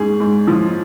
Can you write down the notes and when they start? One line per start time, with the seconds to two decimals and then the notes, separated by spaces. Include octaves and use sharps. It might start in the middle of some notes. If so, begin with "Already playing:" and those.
Already playing: G#2 C#4 G#4
0.20 G#2
0.47 F3